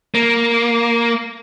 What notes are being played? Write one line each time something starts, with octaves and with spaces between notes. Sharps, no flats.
A#3